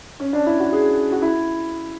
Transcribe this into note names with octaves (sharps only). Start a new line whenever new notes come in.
C#4
D4
E4
F#4
G#4
F#4
E4